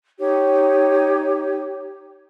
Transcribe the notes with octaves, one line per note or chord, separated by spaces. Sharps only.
D#4 G4 C#5